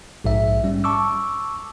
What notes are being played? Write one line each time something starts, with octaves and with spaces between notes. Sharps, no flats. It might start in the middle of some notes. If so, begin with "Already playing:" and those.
A#1 G#2 E5
G3 C#4
A5 C#6 D6 E6